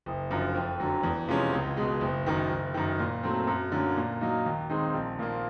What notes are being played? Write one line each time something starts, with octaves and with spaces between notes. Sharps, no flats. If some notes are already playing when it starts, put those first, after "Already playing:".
F#1
F#2 D3 F3
F2
D3 F#3
E2
C3 F3 G#3 C#4
C#2
B2 G#3
F#1
F#2 D#3
F#1
F#2 D#3
A#2
F#3 A3 C4
F#2
D3 F#3 A#3 C#4
A#2
F#3 A#3 D#4
D#2
D#3 G#3 C4 D#4
A#1
A#2 F3 A#3